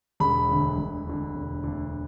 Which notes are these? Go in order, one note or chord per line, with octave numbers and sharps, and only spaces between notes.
E1 B5
D2 D3
E1
D2 D3
E1
D2 D3